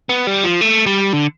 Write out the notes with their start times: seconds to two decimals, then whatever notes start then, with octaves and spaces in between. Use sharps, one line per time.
0.09 B3
0.27 G3
0.44 F3
0.61 A3
0.86 G3
1.13 D3